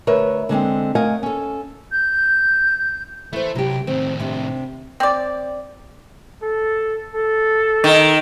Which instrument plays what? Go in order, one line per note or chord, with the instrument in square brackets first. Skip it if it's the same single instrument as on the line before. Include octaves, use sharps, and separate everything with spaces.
[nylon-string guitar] D2 A#4 B4 C#5 E5
D3 G#3 A3 C4
A3 A#4 D#5 F5 F#5 G#5
C#4 A4
[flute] G6
[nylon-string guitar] E3 C5 [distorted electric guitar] A3
[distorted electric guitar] C2 [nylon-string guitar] F#3 G4
[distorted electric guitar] A2 D#3 [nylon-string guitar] C4
[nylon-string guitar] C3 D4
[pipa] C4 D5
[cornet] A4
A4
[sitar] D#3